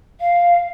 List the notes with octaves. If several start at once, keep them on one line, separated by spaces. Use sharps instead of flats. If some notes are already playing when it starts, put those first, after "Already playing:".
F5